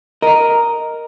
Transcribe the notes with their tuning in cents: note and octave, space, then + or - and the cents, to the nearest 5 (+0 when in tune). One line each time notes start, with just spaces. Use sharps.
A#4 +0 D#5 +0